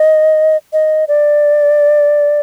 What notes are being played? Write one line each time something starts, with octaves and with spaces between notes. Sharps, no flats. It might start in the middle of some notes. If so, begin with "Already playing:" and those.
Already playing: D#5
D#5
D5